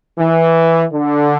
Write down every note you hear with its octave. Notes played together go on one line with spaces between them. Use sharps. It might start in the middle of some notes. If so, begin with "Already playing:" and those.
E3
D3